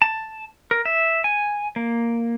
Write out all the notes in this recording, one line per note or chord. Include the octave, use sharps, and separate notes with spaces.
A5
A#4
E5
G#5
A#3